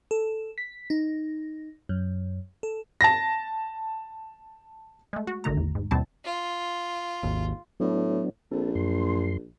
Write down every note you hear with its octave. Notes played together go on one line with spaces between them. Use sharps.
A4
B6
D#4
F#2
A4
A5 A#6
G#3 A3
F#4
A1 D3 D#3 A3 A#5
E2
G#2
D#2 B2 G3 C4 E4 A5
F4
G#1 D#2
A2 F#3 B3 D4
A#1 C4 A4
F#2 C6